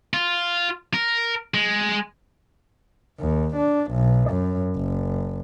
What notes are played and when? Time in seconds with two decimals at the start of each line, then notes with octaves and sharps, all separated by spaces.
0.14 F4
0.94 A#4
1.54 G#3
3.19 D#2
3.56 D4
3.91 B1
4.30 F#2
4.76 F#1